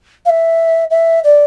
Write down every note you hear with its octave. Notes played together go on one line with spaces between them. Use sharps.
F5
E5
E5
D5